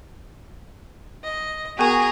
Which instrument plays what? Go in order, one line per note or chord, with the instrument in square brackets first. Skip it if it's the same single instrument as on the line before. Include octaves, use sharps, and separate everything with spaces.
[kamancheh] D#5
[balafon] B3 A#4 G#5 [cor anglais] F#4 [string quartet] G#4 [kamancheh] A#5